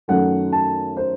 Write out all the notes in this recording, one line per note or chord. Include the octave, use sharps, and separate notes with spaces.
F#2 D#3 F#3 A3 F#5
A5
C5